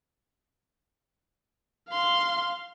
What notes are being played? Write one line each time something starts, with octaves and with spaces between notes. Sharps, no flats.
F5 C6